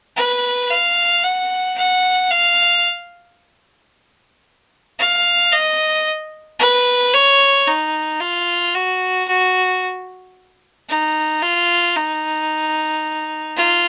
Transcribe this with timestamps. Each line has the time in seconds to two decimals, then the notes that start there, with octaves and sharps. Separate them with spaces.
0.17 B4
0.70 F5
1.23 F#5
1.77 F#5
2.30 F5
4.99 F5
5.52 D#5
6.59 B4
7.14 C#5
7.67 D#4
8.20 F4
8.74 F#4
9.28 F#4
10.89 D#4
11.42 F4
11.96 D#4
13.57 F4